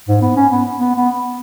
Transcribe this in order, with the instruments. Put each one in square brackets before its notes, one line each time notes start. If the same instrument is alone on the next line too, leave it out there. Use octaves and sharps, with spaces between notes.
[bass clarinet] G#2
B3
C#4
B3
B3
B3